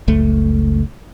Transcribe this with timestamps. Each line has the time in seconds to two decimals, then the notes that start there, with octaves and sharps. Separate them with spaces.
0.08 F#1 C#2 A3